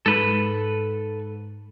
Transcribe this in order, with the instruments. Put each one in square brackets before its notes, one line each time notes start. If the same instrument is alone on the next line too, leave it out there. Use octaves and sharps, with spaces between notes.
[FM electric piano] G#2 [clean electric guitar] A4 B4